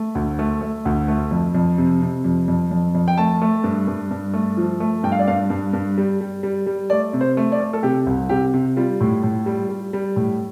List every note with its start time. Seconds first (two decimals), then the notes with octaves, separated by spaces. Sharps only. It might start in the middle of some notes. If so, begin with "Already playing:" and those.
Already playing: A3
0.15 D2
0.39 A3
0.61 A3
0.85 D2
1.08 A3
1.31 F2
1.55 F2
1.78 C3
2.02 C3
2.24 F2
2.48 F2
2.71 F2
2.95 F2
3.08 G5
3.17 A3 A5
3.42 A3
3.64 G2
3.87 G2
4.11 G2
4.34 A3
4.57 F3
4.80 A3
5.03 G2 G5
5.12 F5
5.19 D5
5.27 G2 F5
5.50 G2
5.73 G2
5.98 G3
6.21 G3
6.43 G3
6.66 G3
6.90 A3 D5
7.13 C3
7.21 C5
7.37 A3
7.52 D5
7.60 A3
7.73 A4
7.83 C3 G4
8.07 C2
8.29 C3 G4
8.54 C3
8.76 G3 F4
9.00 A2
9.23 A2
9.46 G3
9.69 G3
9.93 G3
10.16 A2